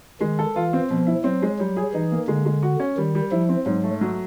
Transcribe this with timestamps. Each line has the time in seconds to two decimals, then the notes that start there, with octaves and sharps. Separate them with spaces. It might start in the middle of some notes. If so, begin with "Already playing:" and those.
0.21 D#3 G#3
0.39 A4
0.56 E3 F4
0.73 C4
0.90 B2 F3
1.07 E4
1.24 F#3 C4
1.42 G#3
1.59 F#3 G3
1.77 G#4
1.94 E3 D#4
2.11 A#3
2.28 D3 G#3
2.45 G#3
2.63 F#4
2.80 C#4
2.97 D#3 G3
3.15 G3
3.32 F3 E4
3.49 C4
3.66 G#2 F#3
3.84 A3
4.01 F#3